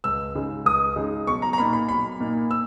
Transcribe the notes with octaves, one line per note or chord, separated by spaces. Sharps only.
C#2 E6
C#3 G#3 D#4
C#2 D#6
C#3 G#3 D#4
B1 C#6
A#5
A#5
A#2 A#3 D#4 B5
B5
B1 B5
A#2 A#3 D#4
E6